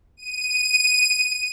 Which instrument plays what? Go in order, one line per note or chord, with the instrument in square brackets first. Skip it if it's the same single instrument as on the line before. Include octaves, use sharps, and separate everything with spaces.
[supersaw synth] D#7